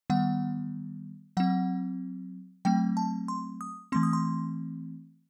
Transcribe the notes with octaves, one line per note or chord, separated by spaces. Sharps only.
D#3 G3 B3 F#5
F#3 C4 F#5
F#3 A3 C4 G5
A5
C6
D#6
E3 A3 C4 C6
D#6
C6